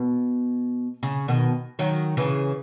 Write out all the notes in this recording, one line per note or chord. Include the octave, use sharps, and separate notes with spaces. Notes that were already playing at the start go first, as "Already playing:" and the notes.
Already playing: B2
C#3
B2 D#3
D#3 F#3
C#3 E3